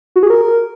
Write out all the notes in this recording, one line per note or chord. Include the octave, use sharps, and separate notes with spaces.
F#4
G#4
A#4